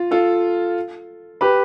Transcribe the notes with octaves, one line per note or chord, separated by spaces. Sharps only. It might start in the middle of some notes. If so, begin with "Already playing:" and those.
Already playing: F4
F4 A4
G4 B4